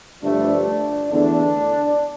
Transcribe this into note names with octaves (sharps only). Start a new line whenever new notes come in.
G2 D3 F3 A3 D4
E2 D3 A3 D4